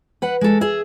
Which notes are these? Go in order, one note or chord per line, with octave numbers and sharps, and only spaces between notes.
B4 F#5
G#3 A4
G#4 E5